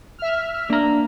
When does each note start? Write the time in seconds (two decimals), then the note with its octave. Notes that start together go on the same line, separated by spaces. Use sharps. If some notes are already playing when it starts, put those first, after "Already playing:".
0.19 E5 F6
0.70 A#3 D4 A#5